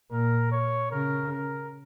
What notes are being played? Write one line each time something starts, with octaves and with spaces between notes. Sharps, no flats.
A#2 A#4
C#5
C#3 A#4
A#4